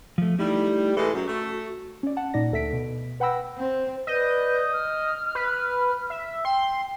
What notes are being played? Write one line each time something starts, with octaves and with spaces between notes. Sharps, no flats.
F3 A3
G3 A3 D#4 E4
A2 E3 G#3 A4
F#2 F#4
A3
C#4 D5
F#5 A5
A#2 D#4 D5 A#6
D2 A4 E5 B6 D7
B2
B4 F#5 G5 B5 E6 A#6
C4
B4 D5 D#5 G6
F6
B4
E5
G5 C6